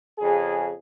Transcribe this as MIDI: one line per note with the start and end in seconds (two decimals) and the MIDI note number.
0.19 0.69 41
0.19 0.69 49
0.19 0.69 68